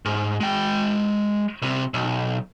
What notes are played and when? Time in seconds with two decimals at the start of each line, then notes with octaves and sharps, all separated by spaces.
0.05 G#2
0.41 G#3 G5
1.62 C2 C3
1.94 B1